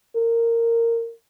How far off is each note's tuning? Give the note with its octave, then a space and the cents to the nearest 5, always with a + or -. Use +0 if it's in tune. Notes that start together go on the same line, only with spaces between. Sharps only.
A#4 -15